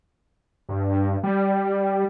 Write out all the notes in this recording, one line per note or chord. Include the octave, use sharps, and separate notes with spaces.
G2
G3